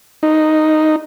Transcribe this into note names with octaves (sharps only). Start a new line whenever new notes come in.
D#4